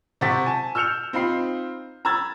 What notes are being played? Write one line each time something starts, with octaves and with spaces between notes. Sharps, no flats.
C3 C5 F#5 C#6 A6 B6
G#5 A5
E6 F6 G6 C#7 E7 F7
C4 D#4 F4 B5 C7
A#5 B5 E6 G#6 A6